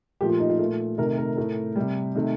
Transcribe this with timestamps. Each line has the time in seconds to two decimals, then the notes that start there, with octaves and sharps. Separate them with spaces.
0.21 A#2 F3 A3 G4
0.30 F4
0.40 D#4
0.50 F4
0.59 A#2 A3
0.98 C3 D#3 A3 A#4
1.18 A#4
1.37 A2 A3
1.76 C3 G3
2.15 C3 D#3 A3